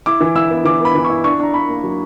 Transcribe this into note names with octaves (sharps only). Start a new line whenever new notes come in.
E4 D6
E3
E4 E6
B3
E3 D6
B3 B5
E3
E4 C#6
D4 C#6
D4 A#5
D4 B5
A#3
F#3